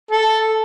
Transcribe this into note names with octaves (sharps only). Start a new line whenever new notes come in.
A4